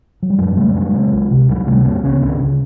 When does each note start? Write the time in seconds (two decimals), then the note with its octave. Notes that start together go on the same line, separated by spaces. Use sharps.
0.23 F#3
0.30 G3
0.38 F#2 F#3 G#3
0.57 C#3 G3 A3
0.68 G3
0.75 F#2 F#3 G#3
0.94 C#3
1.12 C#2
1.30 C3
1.48 C#2 F#3 G#3
1.66 C3 G3 A3
1.85 C#2 A#3 C4
2.04 C#3 B3 C#4
2.22 C#2 C4 D4
2.40 C#3